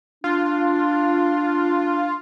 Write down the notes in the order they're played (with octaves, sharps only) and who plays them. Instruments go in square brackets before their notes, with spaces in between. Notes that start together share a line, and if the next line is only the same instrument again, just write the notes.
[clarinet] D4 [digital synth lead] F4